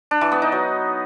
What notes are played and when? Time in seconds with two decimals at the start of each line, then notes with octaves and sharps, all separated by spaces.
0.11 D4
0.21 E3
0.32 B3
0.42 D#4
0.52 F#3